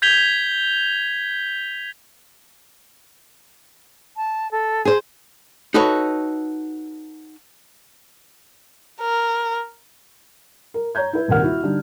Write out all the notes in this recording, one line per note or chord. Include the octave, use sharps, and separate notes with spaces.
G6 G#6 B6 F7 G7
A5
A4
G#4 C5
D#4 F#4 A4 B4 C#5
A#4
A#4
C#5 A#5 G6 G#6
E4 B4
D#1 C2 D#3 A#4 F#5 F6
E4 F#4
D3 G3 D#4